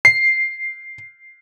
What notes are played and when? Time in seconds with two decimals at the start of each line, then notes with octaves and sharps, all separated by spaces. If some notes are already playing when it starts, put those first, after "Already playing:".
0.05 C7